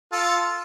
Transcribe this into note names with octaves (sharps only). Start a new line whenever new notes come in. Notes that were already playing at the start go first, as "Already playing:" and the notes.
F4 A4